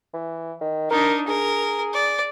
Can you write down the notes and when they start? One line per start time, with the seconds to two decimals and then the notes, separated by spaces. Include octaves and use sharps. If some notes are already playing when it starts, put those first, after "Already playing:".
0.13 E3
0.61 D#3
0.91 D4 D#4 A#4
1.28 G#4 A#4
1.94 D5